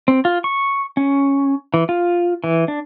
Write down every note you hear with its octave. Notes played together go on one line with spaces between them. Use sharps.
C4
F4
C#6
C#4
E3
F4
E3
D4